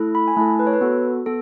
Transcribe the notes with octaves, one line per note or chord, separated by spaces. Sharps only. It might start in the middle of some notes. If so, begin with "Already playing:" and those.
Already playing: A3 E4 A4
B5
G#5
A3 E4 A4 A5
B4
C#5
B4
B3 F#4 A4
B3 A4